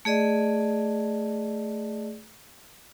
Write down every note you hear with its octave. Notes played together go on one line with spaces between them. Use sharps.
A3 G#4 D5 D#5